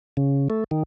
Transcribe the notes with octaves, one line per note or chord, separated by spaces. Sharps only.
C#3
A3
D#3